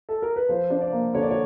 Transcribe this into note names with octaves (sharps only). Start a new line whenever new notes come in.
A4
A#4
B4
F3 C5
D4
D5
A#3
D3 C#5
D5
C#5